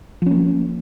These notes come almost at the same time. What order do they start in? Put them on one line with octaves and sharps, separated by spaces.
F3 C#4 A#3